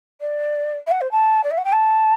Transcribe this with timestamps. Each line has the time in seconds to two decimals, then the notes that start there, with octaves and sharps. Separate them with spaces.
0.21 D5
0.87 E5
0.91 F#5
1.01 C5
1.12 A5
1.44 D5
1.51 E5
1.57 F#5
1.65 G5
1.72 A5